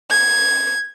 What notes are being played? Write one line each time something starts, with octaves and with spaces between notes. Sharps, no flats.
G#6